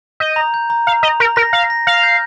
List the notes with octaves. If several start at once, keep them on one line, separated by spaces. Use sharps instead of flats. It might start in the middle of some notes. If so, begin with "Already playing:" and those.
D#5 G6
A#5
G6
A#5
F5 A#5
D#5 A#5
A#4 A#5
A#4 A#6
F5 A#6
A#6
F5 A#6
G6